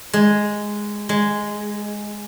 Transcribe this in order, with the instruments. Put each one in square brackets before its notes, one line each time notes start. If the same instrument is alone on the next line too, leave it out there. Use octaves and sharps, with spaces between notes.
[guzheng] G#3
G#3